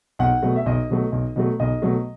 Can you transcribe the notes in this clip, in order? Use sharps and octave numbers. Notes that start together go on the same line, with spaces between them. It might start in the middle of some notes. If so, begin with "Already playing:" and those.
B1 F#5
B2 F#3 A3
E5
B1 D#5
B2 F#3 A3
B1
B2 F#3 A3
B1 D#5
B2 F#3 A3